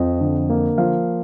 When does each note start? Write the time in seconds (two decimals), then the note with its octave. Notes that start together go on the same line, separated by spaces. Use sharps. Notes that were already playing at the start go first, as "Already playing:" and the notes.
Already playing: F2 F3 D#5
0.21 D3
0.50 A#3
0.78 F3 F5